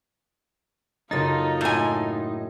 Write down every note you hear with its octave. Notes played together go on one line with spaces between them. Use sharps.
F#1 D#4 F4 A4 A6
A2 G#5